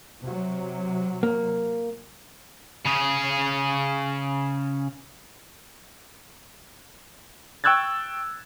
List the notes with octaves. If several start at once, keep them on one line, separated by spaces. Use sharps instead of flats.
C3 F#3
A#3
C#3 G#4
G5 C#6 E6 F#6 G#6 A6